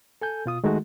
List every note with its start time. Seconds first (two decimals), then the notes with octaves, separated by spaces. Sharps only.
0.21 A4 G#5 G6
0.46 B2 F4 D#6
0.64 D#3 G#3 A3 D#4 F#4